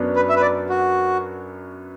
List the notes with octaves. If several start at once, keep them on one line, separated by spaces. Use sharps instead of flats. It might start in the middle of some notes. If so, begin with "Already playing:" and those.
Already playing: F#2 F#3 B3 D4
B4
E5
B4
D5
F#4